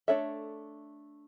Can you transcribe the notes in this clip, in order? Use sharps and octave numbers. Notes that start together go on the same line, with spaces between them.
A3 D4 A4 C#5 E5